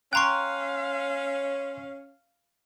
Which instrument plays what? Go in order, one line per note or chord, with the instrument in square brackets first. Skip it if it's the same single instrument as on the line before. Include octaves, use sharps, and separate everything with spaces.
[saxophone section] C#4 [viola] F5 [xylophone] G5 A#5 C#6 [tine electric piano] C6 F#6